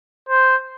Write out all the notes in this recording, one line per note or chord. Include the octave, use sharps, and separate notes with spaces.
C5